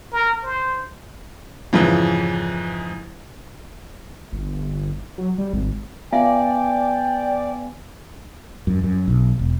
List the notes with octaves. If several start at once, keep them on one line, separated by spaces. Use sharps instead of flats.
A#4
C5
F2 G#2 C#3 E3
G1
F#3
G3
G#1
B3 F4 D5 E5 F5 G5 G#5
F#2
F#2
B1
E1